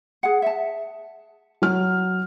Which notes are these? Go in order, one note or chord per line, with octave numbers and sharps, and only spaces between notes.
G#4 F#5
E5 A5
F#3 F6